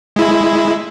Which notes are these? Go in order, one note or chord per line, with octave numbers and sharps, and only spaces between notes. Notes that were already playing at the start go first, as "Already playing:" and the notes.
G#3 E4